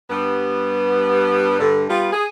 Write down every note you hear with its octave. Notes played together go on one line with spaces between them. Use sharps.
G2 G3 B3
G2 D3
G3 B3 F4
G#4